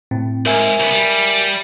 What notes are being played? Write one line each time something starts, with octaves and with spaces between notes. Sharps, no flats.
A2 C4
F2 G#2 A#4 E5 G#5
C2 B3
G3